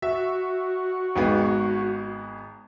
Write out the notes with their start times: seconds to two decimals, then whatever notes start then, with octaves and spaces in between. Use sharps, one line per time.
0.02 F#4 E5
1.16 G#1 G#3 B3